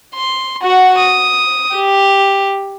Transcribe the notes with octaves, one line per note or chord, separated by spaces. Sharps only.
C6
F#4 F#5
D#6
G4